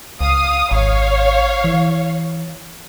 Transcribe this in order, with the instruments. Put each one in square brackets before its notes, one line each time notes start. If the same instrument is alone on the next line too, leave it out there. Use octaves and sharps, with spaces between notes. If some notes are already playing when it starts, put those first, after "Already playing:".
[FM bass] C#2 [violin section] F5 D#6
[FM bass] G#1 [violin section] C#5 F5
[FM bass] E3